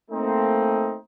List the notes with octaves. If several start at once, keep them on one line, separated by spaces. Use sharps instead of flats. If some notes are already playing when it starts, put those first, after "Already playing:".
A3 A#3 C4 D#4